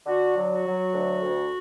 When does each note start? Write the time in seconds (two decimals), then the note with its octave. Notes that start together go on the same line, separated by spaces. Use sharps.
0.06 D3 F#4
0.34 F#3
0.49 F#4
0.65 F#3
0.94 D2
1.22 D2